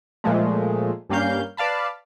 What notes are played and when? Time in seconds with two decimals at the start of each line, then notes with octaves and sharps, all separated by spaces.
0.24 A#2 F3 G#3 A3
1.09 G2 G3 A#3 C#4 F5 G6
1.57 B4 D5 F5 A5 B5